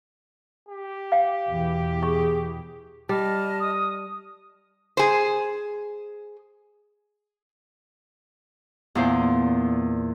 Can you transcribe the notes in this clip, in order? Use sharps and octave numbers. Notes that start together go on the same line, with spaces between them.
G4
F5 G5
E2 B2 E3
G#4 C#6
G3 D#5 A5 F6
D#6
G#4 C5
E2 A#2 C5